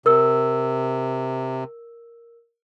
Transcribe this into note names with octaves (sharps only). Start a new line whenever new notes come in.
C3 A#4 E6